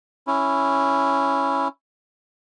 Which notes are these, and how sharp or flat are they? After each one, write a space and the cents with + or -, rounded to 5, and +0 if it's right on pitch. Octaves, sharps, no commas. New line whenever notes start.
C#4 +0 E4 +0